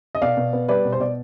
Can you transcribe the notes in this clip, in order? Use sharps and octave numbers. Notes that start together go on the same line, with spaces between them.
D#5
B2 D5 F5
B2
B3
G3 B4 D5
B2
C5
B2 D5